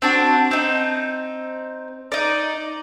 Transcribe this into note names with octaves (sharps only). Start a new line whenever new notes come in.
C4 D4 F#4
C4 D#4
D#4 D5